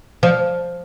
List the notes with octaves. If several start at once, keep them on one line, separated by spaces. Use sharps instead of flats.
F3